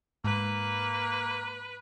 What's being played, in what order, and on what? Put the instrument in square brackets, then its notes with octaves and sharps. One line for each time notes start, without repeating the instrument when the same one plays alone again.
[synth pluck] G#2 [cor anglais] A#3 [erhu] B4